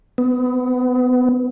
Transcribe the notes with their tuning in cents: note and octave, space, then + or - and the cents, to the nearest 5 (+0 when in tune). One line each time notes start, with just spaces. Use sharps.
B3 +25